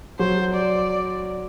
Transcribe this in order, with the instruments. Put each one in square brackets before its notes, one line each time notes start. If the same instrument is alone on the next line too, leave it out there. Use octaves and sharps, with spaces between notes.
[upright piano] F#3 [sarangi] C5
[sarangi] D5